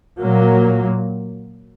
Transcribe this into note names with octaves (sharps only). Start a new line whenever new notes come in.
A#2 F#3 A#3